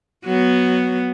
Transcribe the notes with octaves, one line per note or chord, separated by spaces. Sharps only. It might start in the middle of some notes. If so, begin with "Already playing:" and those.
F#3 B3